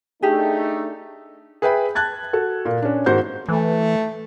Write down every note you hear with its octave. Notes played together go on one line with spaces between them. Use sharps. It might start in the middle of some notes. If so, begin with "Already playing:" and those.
A3 D4 D#4 G4 G#4
G#4 B4 E5 G5 B5
A5 F#6 G#6 A6
F#4 A4
A#2
C#4 D4
G#2 D#3 F#4 C5 C6 G6
E3 A3